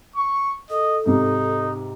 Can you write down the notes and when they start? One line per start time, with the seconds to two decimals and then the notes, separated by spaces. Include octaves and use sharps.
0.15 C#6
0.70 A4 D#5
1.06 G#2 C3 D#4